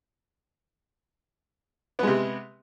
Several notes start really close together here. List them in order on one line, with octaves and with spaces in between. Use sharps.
B3 G#3 C3